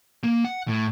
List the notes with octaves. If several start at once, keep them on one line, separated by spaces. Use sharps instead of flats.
A#3
F#5
A2